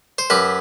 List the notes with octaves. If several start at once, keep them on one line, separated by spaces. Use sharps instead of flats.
C5
F#2 G4 B4